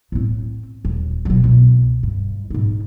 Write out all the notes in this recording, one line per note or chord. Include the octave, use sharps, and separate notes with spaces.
A2 C4
D#1
B2 F#3
C2 B2
G2
G#2 D#4